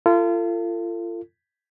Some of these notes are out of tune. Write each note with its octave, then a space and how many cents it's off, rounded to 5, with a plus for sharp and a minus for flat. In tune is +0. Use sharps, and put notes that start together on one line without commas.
F4 -30 A4 +35